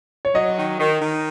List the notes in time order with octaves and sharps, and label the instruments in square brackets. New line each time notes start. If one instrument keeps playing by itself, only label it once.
[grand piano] C#5
[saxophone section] F#3 [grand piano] D#5
[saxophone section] D#3
D#3
D#3